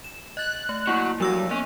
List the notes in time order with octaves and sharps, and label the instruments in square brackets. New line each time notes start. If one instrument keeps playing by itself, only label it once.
[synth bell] E7
[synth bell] D#5 A6 [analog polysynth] F#6
[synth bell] A3
[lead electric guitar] F#3 F#4 [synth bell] A#3 E4
[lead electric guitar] G2 [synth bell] F3 E6 A#6 [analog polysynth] F#3
[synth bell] A#3 B3 [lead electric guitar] C#4